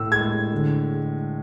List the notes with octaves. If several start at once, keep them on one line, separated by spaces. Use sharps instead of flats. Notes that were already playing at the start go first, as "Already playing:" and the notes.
Already playing: A2 E6
G#3 G#6
D3
G#3